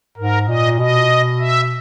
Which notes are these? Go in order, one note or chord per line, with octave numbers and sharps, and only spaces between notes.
G#2 A#4
A#2 D#5
B2 D#5
E5